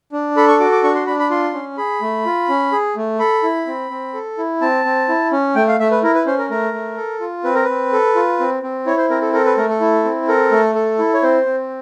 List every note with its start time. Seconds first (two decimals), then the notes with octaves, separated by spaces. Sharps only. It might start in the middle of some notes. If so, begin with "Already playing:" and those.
0.12 D4
0.37 A4 B5
0.48 C#6
0.60 F#4 D6
0.72 D6
0.84 D4 C#6
0.95 C6
1.07 D4 B5
1.19 B5
1.30 F4 C6
1.54 C#4
1.77 G#4 B5
2.02 A3
2.26 F4
2.49 C#4
2.72 G#4
2.96 A3
3.19 A4 B5
3.43 E4
3.67 C4
3.91 C4
4.14 A4
4.38 E4
4.61 C4 A5
4.85 C4
5.09 E4
5.32 C#4
5.55 A3 G5
5.68 F5
5.80 A3 E5
5.91 B4
6.03 E4 A#4
6.15 B4
6.26 C#4 C5
6.39 A#4
6.50 A3 A#4
6.73 A3
6.97 A4
7.20 F4
7.44 C4 B4
7.55 A#4
7.64 C4 B4
7.92 A4
8.16 F4
8.40 C4
8.63 C4
8.86 E4 C#5
8.98 C5
9.10 C4 A#4
9.22 A4
9.33 A4 A#4
9.46 B4
9.58 A3 A#4
9.69 A4
9.80 E4
10.04 C4
10.28 A4 A#4
10.51 A3
10.75 A4
10.99 E4
11.14 C#5
11.23 C4 C5
11.46 C4